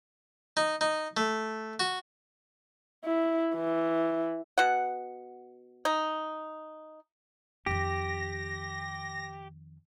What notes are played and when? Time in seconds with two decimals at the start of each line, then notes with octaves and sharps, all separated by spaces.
0.57 D#4
0.81 D#4
1.17 A3
1.80 F#4
3.04 E4
3.55 E3
4.58 B2 F#5
5.85 D#4
7.66 F2 D#3 G4 A#6